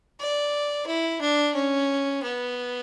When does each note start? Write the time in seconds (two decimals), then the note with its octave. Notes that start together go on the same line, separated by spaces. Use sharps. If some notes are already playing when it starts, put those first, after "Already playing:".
0.20 D5
0.87 E4
1.21 D4
1.55 C#4
2.23 B3